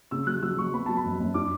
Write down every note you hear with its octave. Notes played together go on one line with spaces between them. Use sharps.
C#3 E6
F#3 F#6
F#3 E6
F#3 C#6
B3 B5
F#3 A5
B5
F#2
F#2
D4 D6